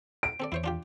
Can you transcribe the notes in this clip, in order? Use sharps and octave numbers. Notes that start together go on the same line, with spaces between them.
D7
C4 A4 D5
E2 E4 C5 C#5
D4 F4 G4